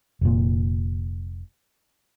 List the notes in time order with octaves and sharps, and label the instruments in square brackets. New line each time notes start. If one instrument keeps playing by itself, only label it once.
[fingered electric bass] F1 A#2